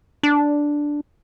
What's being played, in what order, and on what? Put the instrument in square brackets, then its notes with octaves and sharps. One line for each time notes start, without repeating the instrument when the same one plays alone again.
[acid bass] D4